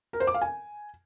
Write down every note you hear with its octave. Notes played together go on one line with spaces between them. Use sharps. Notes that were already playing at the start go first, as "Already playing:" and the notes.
A#4
C5
D6
F5
G#5